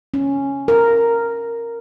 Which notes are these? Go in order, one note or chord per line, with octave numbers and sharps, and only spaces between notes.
C#4
A#4